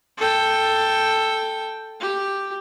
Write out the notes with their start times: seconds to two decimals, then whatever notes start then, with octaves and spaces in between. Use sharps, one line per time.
0.17 A4 G5
2.00 G4